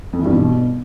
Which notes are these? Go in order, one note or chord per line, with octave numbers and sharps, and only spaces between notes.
F2
E3
G2
B2